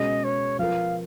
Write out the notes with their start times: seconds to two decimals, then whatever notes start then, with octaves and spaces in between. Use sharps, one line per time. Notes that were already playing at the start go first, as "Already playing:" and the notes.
Already playing: B2 G#3 C#4 G#4 D#5
0.24 C#5
0.59 F3 B3 F4 A#4 F5